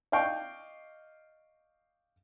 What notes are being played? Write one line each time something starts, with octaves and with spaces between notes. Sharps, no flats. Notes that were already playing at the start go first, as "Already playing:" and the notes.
D5 D#5 F5 G5 C#6